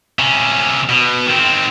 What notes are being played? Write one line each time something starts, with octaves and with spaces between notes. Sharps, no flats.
C3 C#4
B2
D#3 C4